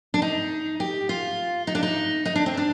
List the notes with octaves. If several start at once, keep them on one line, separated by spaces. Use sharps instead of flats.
D4
D#4
G4
F4
D#4
D4
D#4
D#4
D4
C4
D4